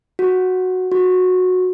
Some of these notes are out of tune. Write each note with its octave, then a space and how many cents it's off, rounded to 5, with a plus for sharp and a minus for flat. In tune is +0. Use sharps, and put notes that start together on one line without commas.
F#4 -5
F#4 -15